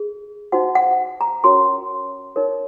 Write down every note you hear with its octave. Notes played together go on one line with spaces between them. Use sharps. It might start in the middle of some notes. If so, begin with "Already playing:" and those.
Already playing: G#4
D#4 F#4 C5 F#5
F#5
A#5
C#4 F#4 A#4 C#5 C6
D#4 A#4 C#5